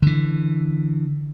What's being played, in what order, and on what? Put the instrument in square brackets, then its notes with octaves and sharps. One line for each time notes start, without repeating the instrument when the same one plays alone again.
[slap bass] D3 E3